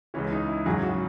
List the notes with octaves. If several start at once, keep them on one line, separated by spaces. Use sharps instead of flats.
C#2 C#3 E3 C#4
D#4
E4
G#1 F#2 C#3 F#3 G#4
F#4